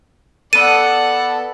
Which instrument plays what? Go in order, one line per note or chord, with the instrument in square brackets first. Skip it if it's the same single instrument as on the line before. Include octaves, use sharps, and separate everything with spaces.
[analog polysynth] B3 A4 [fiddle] D5 F#5 [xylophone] D#7